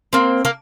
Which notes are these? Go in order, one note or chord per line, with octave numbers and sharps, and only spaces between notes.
A#3 C4
A#3